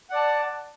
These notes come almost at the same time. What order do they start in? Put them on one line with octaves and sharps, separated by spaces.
F#5 D5 A5